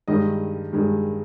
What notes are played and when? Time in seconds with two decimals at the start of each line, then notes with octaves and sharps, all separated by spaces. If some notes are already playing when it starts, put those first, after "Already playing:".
0.08 G2 D#3 G#3 D#5
0.73 G2 D#3 G#3